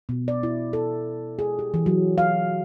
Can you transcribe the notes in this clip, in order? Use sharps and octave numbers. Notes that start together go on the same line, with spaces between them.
B2
D5
E4
A4
G#4
G4
E3
F#3
F5